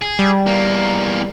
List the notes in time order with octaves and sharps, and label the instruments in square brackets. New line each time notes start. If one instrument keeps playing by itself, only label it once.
[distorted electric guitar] G#4
[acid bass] G3
[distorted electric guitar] E2 A#3